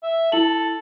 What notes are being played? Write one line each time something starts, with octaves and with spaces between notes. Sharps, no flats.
E5
E4 A4 F#7